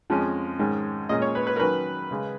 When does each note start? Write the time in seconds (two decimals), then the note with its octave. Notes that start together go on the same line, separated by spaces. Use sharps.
0.10 F2 F3 G#3 C#4
0.59 G#2 D#3 G#3 C#4
1.09 A#2 G#3 C#4 D#5
1.22 C#5
1.35 B4
1.47 B4
1.56 A#4
1.60 D#3 F#3 C#4 B4
2.11 C#3 G#3 C#4